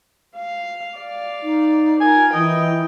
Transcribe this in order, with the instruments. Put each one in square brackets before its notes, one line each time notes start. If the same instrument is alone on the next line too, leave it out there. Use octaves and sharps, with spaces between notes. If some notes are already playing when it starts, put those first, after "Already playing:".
[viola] F5
D5 F5
[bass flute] D#4
[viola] F4 A#4 [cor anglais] G#5
[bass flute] E3 [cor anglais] D#5 [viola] G5